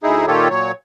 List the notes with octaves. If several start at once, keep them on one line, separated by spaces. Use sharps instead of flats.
D2 D#4 E4 G#4
A#2 D#3 F4 G4 A4 C#5
A#2 F#3 C#5